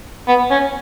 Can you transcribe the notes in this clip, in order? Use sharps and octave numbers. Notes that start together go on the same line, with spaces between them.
B3
C#4